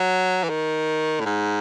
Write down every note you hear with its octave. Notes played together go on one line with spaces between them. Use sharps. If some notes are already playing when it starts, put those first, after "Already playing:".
Already playing: F#3
E3
D#3
A2
G#2